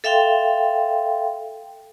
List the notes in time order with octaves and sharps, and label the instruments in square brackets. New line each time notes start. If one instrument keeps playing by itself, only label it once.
[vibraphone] A4 E5 F5 G5 C6